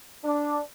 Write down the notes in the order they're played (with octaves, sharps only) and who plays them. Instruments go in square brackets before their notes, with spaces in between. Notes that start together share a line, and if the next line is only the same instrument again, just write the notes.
[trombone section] D4